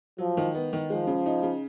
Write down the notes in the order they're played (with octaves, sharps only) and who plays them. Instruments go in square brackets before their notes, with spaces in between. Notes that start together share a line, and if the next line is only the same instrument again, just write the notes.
[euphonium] F3 [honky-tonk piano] F#3
[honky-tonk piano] D#3
B3
D#3
[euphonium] F3 [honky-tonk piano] G#3
[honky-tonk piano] C#3
D#4
C#3